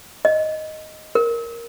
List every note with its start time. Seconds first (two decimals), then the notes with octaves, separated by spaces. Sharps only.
0.25 D#5
1.15 A#4